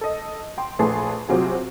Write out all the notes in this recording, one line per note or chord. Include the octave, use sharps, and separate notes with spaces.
A4 D#5
G5 C6
A#1 A3 G#4 B4 A5 C6
C3 F#3 C4 F4 F#4 G#4